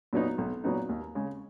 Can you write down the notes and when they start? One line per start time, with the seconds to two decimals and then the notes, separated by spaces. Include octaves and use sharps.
0.13 A#2 F#3 B3 D#4
0.38 B1
0.64 A#2 F#3 B3 D#4
0.89 D#2
1.15 C#3 G#3